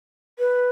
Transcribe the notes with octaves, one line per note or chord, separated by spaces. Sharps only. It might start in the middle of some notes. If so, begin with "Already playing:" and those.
B4